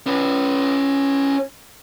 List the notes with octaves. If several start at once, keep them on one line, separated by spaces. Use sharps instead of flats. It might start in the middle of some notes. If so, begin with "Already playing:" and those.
C#4 B4